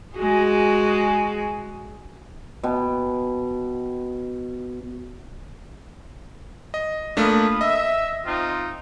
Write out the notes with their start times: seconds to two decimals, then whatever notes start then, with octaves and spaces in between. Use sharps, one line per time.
0.16 G#3 F#4 G#4
2.63 B2 G5
6.74 D#5
7.17 A3 A#3 D4 F4 B5 D#6
7.61 D#5 E5
8.26 C4 D#4 F4